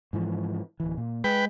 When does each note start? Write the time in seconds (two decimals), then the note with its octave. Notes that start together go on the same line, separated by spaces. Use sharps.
0.13 G#2 E3 F3
0.80 D1 E3
0.97 A#2
1.24 G#3 B4 G5